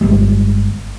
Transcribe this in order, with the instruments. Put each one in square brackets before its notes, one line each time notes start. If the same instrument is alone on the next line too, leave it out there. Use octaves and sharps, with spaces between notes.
[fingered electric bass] G1 G2 G3 G#3